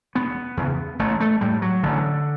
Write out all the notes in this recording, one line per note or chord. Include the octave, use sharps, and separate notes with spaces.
E1 B3
E2 C#3
A1 A3
A3
A2 G3
F#3
A1 D3